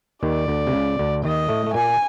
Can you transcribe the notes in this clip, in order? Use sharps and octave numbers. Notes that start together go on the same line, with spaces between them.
D#2 D#3 D5
D2 D3
C3
C#2 C#3
D2 D3
D#2 D#3 D#5
A2 A3
A3
A#2 A#3 G#5